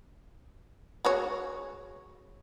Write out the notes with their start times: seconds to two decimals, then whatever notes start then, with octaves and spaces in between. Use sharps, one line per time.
1.05 G#3 F#4 C#5